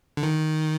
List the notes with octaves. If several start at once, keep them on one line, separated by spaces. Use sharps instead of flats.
D3
D#3